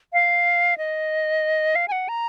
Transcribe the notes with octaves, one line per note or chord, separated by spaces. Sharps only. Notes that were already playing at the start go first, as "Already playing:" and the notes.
F5
D#5
F5
G#5
F#5
A#5